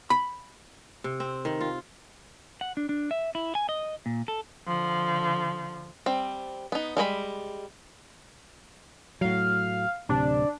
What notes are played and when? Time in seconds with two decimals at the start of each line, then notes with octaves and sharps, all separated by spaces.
0.10 B5
1.04 C3
1.20 C4
1.45 D#3
1.61 F4
2.61 F#5
2.77 D4
2.89 D4
3.11 E5
3.35 E4
3.55 G#5
3.69 D#5
4.06 A#2
4.28 A4
4.67 D3 F3
6.06 G3 C4
6.72 B3 D#4
6.97 G3 G#3 C5 B5
9.21 A2 F#3 F5
10.09 D1 C3 D4